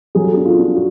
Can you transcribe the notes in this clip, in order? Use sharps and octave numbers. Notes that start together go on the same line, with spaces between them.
F#3 G#4
A4
D4 G#4
F4
D4
F#4